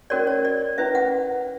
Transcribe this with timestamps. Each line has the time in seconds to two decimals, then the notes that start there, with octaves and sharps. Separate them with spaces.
0.10 C#4 F#4 A#4 C#5 D5
0.27 C#5
0.45 D5
0.78 C#4 E4 B4 E5
0.95 F#5